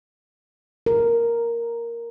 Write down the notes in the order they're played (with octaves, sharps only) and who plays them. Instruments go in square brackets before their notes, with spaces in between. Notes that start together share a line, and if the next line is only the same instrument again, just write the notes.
[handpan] A#4